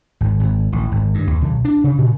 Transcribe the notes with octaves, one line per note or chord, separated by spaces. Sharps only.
G#1
G#1
A1
G#1
G2
D#2
B1
D4
C#3
A#2